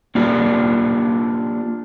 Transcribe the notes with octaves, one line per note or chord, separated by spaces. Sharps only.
A#3 D4 F4 G4